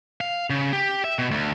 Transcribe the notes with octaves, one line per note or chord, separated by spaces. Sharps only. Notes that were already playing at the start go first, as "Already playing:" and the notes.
F5
C#3
G4
E5
B2
D2